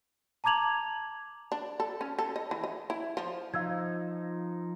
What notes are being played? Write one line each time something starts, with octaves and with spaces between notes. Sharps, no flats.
A5 A#5 D6 G#6 F7 F#7
D4
A4
C#4
A4
D#5
E3
D#5
E4
F3
F3 D#4 F5 E6 G#6